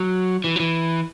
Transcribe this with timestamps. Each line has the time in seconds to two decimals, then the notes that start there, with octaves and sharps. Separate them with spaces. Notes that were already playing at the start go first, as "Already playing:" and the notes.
Already playing: F#3
0.44 E3
0.56 F#3
0.60 E3